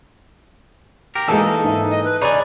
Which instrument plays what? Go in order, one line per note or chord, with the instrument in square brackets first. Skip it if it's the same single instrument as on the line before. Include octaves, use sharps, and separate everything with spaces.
[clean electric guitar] G4 A#4
[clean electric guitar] E3 A#3 D#4 [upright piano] G#3 D#6 [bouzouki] A4
[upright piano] G#2 E5
[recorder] D#5
B4
[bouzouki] C#3 [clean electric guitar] D#4 G#4 [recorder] D5 [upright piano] B5